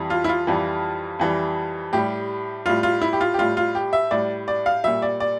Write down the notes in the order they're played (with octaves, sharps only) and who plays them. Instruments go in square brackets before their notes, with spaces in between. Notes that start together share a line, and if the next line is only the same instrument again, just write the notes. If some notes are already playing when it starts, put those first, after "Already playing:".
Already playing: [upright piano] F2 E3 G3
F4
E4
F4
F2 E3 G3
F2 E3 G3
A2 G3 G4
A2 G3 F4
F4
E4
G4
F4
G4
A2 G3 F4
F4
G4
E5
A2 G3 D5
D5
F5
A#2 G3 E5
D5
D5